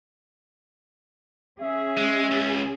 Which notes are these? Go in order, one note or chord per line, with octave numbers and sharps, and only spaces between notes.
C#4 G#4 E5
G#3
C#2